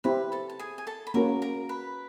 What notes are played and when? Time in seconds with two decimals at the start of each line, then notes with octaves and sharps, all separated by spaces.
0.04 C4 E4 G4 B4 C5 B5
0.32 A4 A5
0.50 A5
0.59 G#4 G#5
0.78 G#5
0.87 A4 A5
1.07 B5
1.14 A#3 C#4 F#4 A#4 A#5
1.42 A#4 A#5
1.69 B4 B5